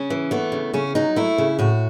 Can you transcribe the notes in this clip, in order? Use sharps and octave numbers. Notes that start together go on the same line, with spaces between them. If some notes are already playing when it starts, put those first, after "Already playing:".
Already playing: C#3 C#4
E3
A3 B3
C#3
C#3 C#4
F#3 D#4
A3 E4
C#3
A2 F#4